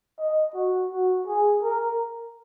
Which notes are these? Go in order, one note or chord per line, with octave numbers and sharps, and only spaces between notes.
D#5
F#4
F#4
G#4
A#4